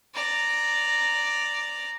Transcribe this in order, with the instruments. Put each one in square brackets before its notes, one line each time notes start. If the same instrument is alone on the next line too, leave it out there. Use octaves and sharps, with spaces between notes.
[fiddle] D5 A#5